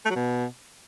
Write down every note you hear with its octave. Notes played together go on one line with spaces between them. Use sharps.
A3
F#3
B2